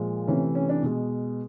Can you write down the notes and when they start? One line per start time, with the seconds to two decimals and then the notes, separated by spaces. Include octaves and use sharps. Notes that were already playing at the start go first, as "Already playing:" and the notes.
Already playing: A#2 F3 G#3
0.27 C3 E3 A3 C#4
0.55 C#4
0.69 D4
0.83 B2 G#3